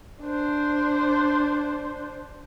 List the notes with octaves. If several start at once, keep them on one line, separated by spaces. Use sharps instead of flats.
D4 C5